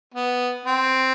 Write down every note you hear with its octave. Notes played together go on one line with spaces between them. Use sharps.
B3
C4